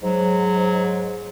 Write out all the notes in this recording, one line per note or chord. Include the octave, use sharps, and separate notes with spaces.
G#2 F#3